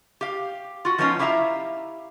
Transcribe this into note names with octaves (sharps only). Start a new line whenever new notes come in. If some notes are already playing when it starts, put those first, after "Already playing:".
G4 F5
F4 F#4
F3 F#3 B3 C#4 D#4 F4
E4 G4 E5 F5 A5 A#5